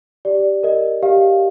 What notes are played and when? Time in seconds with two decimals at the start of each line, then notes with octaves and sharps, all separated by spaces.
0.25 G4 D5
0.63 A#4 D#5
1.02 G4 F5